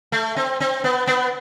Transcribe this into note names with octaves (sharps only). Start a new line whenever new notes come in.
A3
C4
C4
B3
B3